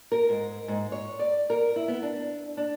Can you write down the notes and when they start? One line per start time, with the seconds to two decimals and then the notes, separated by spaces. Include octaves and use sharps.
0.12 A#4
0.29 G#2
0.68 G#2
0.92 C#5
1.19 D5
1.50 A#4
1.76 E4
1.88 B3
2.03 D4
2.57 D4